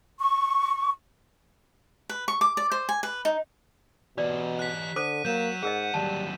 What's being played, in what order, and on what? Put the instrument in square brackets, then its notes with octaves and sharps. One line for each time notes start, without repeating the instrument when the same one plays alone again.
[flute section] C#6
[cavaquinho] B4
C#6
D6
D5
C5
G#5
B4
D#4
[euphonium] B2 [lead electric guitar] E3 G4 [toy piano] D5
[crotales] F#6 B6
[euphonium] D3 [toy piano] A4 C5 D6 [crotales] D#7
[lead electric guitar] F#3 [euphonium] A#3 [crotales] G6 E7
[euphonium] G#2 [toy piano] G#4 A#4 D#5 [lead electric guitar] F#5
[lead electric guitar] D#2 F#3 [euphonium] G3 [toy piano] A5